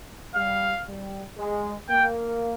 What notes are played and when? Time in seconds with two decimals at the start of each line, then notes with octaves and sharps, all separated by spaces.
0.35 G3 F5
0.87 G3
1.37 G#3
1.89 A#3 G5